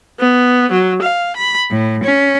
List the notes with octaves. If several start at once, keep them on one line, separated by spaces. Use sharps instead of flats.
B3
F#3
F5
B5
A2
C#4